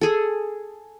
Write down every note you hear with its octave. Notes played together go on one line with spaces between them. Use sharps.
G#4 A4